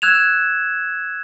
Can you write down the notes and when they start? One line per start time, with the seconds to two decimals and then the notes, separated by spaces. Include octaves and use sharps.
0.02 E6 F#6 G#6 E7 F7